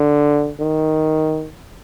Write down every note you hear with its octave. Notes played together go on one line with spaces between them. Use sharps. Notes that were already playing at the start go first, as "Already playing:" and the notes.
Already playing: D3
D#3